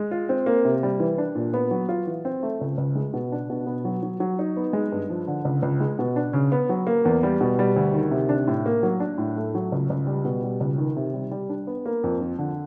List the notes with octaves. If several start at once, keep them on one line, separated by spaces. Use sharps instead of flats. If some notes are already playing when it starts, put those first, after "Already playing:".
Already playing: G#3
F4
C4
A#3
C3
G3
E3
D4
A#2
B3
F#3
F4
E3
C4
A3
C#2
C#2
G#3
B2
D4
B2
B3
F#3
F#3
F#3
D#4
B3
G#3
G2
F3
D3
C#2
C#2
G#3
B2
D4
C#3
B3
F#3
A#3
E2
G3
B2
G3
D2
D#3
C3
D4
A2
A#3
F#3
D4
A2
A3
F#3
C#2
C#2
G3
B2
G3
C#2
D#3
C3
G3
G3
D4
B3
A#3
F2
F3
D3